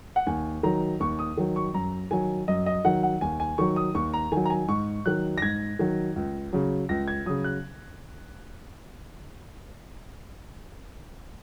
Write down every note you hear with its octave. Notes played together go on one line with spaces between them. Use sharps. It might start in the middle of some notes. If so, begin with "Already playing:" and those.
F#5
D#2 G#5
D#3 F#3 A#5
D#2 C#6
D#6
D#3 F#3
C#6
F#2 A#5
D#3 F#3 G#5
F#2 D#5
D#5
D#3 F#3 F#5
F#5
D#2 G#5
G#5
D#3 F#3 C#6
D#6
D#2 C#6
A#5
D#3 F#3 G#5
A#5
G#5
G#2 C#6
D#3 F#3 F#6
A#6
G#2 G#6
D#3 F#3
C#2
C#3 F#3
C#2 A#6
G#6
C#3 F#3 D#6
F#6